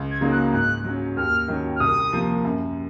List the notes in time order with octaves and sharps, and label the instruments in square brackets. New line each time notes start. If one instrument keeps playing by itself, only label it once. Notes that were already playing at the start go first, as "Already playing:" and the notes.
Already playing: [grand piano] C#2
[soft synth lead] G#6
[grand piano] C#3 F#3 A#3 D#4
[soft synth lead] F#6
[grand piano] G#2 [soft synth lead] F#6
[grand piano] F#3 C#4
[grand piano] D#2 [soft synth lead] F6
[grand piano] D#3 F#3 C#4
[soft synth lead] F6
[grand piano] C2 [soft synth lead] D#6
[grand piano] C3 F3 A#3
F#2